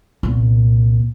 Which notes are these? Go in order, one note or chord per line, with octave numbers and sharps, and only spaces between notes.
C2 A#2